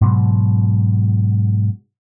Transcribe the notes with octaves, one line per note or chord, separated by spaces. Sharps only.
G#2 B2 F#3